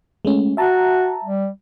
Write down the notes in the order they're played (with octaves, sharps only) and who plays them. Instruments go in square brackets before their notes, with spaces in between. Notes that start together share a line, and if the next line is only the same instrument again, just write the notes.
[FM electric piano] G#3 A3 C#4
[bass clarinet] F#4 [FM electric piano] E5 A5 A#5
[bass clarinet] G3